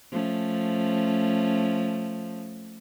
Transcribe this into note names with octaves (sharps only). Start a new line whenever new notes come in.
F3 A3 C#4